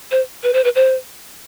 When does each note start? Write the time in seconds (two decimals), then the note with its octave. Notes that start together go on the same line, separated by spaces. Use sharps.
0.11 C5
0.43 B4
0.53 C5
0.64 B4
0.75 C5